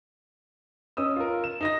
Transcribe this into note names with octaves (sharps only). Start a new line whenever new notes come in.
C#4 D#5 D#6 E6
F4 A#4
E7
D#4 D#5 A#6